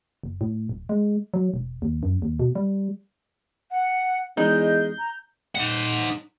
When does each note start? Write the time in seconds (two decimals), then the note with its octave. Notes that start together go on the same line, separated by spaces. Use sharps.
0.24 F#1
0.41 A2
0.69 D1
0.89 G#3
1.34 F#3
1.54 E1
1.82 D#2
2.03 F#2
2.22 D#2
2.40 B2
2.55 G3
3.71 F#5
4.37 E2 G#3 D#4 D#5 G6
4.99 A#5
5.55 D#4 F#5